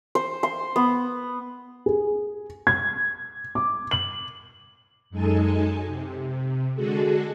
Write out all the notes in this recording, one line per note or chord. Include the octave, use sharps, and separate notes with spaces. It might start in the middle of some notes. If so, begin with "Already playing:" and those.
C5
C6
B3
G#4
G#6
D6
F#7
F#2 G#3 D#4 A4 G#5 A5
C3
D3 G#3 F#4 G#4 A4